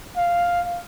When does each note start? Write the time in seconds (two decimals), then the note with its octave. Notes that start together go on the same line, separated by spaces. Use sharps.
0.17 F5